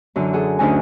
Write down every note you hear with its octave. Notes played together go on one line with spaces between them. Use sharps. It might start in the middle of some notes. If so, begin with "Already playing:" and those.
F#2 D3 E3
F#4 G#4 A4
D2 D3 C#4 D#4 G#5